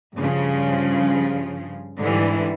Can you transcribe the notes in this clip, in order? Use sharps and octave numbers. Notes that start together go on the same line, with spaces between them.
G2 C#3 F3
G#2 D3 E3 G3